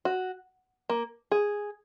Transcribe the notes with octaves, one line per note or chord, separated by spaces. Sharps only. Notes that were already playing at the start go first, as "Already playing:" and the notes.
F#4
A#3
G#4